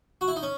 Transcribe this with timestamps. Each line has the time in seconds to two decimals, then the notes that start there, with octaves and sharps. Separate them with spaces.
0.21 F#4
0.28 E4
0.36 D#4
0.43 C#4